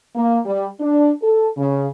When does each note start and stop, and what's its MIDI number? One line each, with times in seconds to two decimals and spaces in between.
0.16 0.39 58
0.46 0.67 55
0.81 1.11 62
1.22 1.48 69
1.57 1.89 49